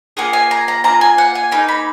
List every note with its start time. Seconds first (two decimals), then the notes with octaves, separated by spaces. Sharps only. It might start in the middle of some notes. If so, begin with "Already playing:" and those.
0.17 A#3 F4 G#4 F#5
0.33 G#5
0.51 A#5
0.68 A#5
0.84 A#3 F4 G#4 A#5
1.01 G#5
1.18 F#5
1.35 G#5
1.52 A#3 D#4 G#4 B5
1.69 B5